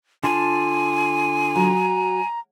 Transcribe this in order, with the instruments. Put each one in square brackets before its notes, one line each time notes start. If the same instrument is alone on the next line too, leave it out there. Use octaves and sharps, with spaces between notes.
[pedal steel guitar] D3 F4 A5 [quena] G#5
[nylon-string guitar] F#3 [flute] A#5